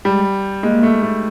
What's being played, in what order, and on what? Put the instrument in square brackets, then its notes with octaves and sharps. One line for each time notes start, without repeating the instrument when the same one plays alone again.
[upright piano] G3 [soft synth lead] G#3
[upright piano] G#3 [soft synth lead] A#3
[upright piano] A3
A3